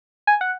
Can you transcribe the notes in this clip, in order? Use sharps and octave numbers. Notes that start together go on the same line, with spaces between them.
G#5
F#5